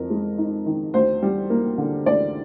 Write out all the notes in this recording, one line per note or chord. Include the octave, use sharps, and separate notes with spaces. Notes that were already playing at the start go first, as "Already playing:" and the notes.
Already playing: F2 A#4
G#3
D#4
D#3
D2 C5
G3
A#3
D3
D2 D5